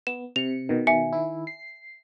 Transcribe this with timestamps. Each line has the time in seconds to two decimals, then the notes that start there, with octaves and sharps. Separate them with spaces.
0.07 B3 E7
0.36 C3 C#7 F7
0.69 B2 D#3
0.87 E5 G#5 C#7
1.13 D#3 E4
1.47 C7